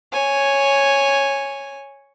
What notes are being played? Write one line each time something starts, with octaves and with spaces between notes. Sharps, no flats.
C#5 G#5